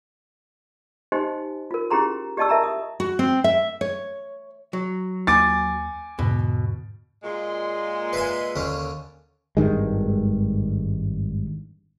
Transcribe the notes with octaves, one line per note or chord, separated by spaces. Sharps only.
D#4 G4 C5 D#5 G#5 C6
F4 A#4
C#4 E4 G4 G#4 A#5 C6
G4 D5 D#5 A5 C#6 E6
A#4 E5 A5 A#5
D#6
F#4
C4
E5
C#5
F#3
D#2 A#3 G#5 D6 A6
E2 G#2 B2 D3
A#2 G#3 C6
B4 E5 G#5
D#2 D3 C#4
G#1 G2 D#3 G#3